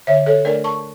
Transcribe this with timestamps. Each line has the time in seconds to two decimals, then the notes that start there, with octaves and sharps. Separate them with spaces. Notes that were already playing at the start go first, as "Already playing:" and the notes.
0.07 D3 C#5 E5
0.26 A4 C#5
0.45 A3 D4 A#4 D5
0.64 A5 C#6